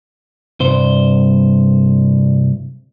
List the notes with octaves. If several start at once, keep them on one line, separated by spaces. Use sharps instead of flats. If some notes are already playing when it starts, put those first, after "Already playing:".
C2 G2 C5